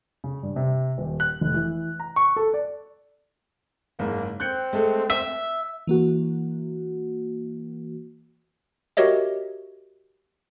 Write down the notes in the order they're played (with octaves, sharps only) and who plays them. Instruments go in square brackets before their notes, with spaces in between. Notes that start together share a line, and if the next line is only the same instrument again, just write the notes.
[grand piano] C#3
G2
C3
D#1
F#6
F1
E3
A#5
C#6
A4
D5
[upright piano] F#1 G#2 [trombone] A#3
[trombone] C4 [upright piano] F#6 G6 C#7
[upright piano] G#3 A3 A4
[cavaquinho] E5 [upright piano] B6
[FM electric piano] E3 A#3 F#4
[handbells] F#4 G4 A#4 C#5 D#5 E5